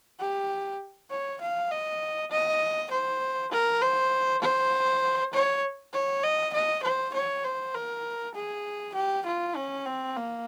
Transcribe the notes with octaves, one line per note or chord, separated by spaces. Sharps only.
G4
C#5
F5
D#5
D#5
C5
A#4
C5
C5
C#5
C#5
D#5
D#5
C5
C#5
C5
A#4
G#4
G4
F4
C#4
C4
A#3